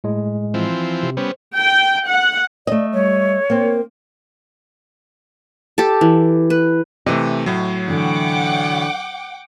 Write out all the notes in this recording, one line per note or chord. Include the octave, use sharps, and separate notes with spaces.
A2 G#3
E3 F3 C4
C3
G3 B3 C#4 C5
G5
F#5
A3 D5 D#5
G3 C#5
A#3 C4
A#4
G4 A4
E3
B4
C3 E3 A3 D#5
A2 F#3
D3 E3 F#5 G5 D6